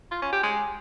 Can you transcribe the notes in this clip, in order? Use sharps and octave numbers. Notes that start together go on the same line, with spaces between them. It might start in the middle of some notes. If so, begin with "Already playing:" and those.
F4
C#4
G4
G#3